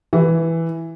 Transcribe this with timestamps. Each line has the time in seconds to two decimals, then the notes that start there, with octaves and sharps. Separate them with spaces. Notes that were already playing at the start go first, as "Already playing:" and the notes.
0.13 E3